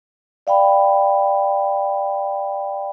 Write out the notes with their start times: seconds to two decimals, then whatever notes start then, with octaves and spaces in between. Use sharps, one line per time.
0.47 D5 F5 G5 B5